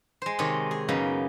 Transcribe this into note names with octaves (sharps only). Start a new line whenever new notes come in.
G#3 C5
C3 D#3 D#4 C#5 D#5
G#4
F#2 C#3 A#3 B3 D#4